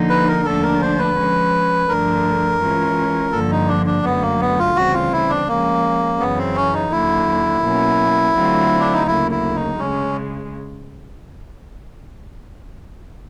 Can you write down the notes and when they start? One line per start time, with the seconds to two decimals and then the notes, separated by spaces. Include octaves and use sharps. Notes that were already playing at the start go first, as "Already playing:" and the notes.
Already playing: D3 F3 A#3 D#4
0.10 B4
0.28 A#4
0.44 D#2 D3 F3 A3 D4 A4
0.63 A#4
0.81 C5
0.99 B4
1.17 F3 G#3 C#4
1.88 G2 D3 F3 A3 D4 A#4
2.60 E3 G#3 C#4 F4
3.32 G2 D3 F3 A#3 A4
3.51 D#4
3.68 D4
3.86 D4
4.04 F#2 D3 F#3 A3 B3
4.22 A#3
4.40 B3
4.59 F4
4.76 D2 C#3 E3 G3 C4 F#4
4.94 F4
5.12 E4
5.29 D4
5.47 F3 G#3 A#3 C#4
6.20 F#2 C#3 E3 B3
6.38 C4
6.56 C#4
6.73 D#4
6.92 D#2 D3 F#3 E4
7.63 B2 F#3 A#3 C#4
8.36 D3 F#3 A3 C4 F4
8.80 D4
8.94 D#4
9.07 D2 C#3 F#3 A#3 E4
9.31 E4
9.55 D#4
9.79 C#3 G#3 C#4